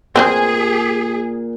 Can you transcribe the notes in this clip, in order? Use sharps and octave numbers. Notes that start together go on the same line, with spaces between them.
A#2 C4 G#4 B4 C5